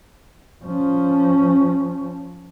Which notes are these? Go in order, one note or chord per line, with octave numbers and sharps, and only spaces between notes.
F3 C#4